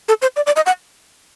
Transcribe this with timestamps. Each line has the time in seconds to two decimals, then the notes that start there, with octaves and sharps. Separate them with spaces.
0.08 A4
0.22 C5
0.36 D5
0.47 D5
0.56 D#5
0.66 F#5